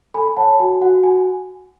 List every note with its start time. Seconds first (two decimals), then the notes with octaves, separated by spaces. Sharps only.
0.14 A4 G#5 B5
0.37 C#5 F#5 A5
0.60 F#4 G#5
0.81 F#4 F#5
1.03 F#4 G#5